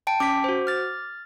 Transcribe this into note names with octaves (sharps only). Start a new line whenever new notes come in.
G5 A5 D7
C#4 D6 B6
F#4 C5
F6 A6